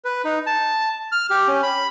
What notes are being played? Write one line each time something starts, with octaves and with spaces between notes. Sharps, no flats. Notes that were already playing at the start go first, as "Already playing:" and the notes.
B4
D#4
A5
F6
G4
C#4
B5